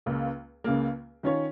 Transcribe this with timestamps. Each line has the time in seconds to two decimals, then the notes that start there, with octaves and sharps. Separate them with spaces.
0.06 C#2 C#3 A#3
0.64 C#2 C#3 A#3
1.23 D#3 C#4 F4 C#5